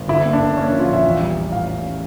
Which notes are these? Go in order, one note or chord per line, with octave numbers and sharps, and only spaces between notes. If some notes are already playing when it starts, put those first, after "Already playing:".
Already playing: G1
D3 E4
A#3
D4
D3
A#3 C#4
D4
F3
F4
A#1 E5
E2
G3
E2
A2 F5
C#4
A2